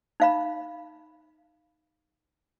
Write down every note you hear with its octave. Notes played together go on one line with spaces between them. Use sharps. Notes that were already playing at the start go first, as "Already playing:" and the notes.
D#4 F5 B5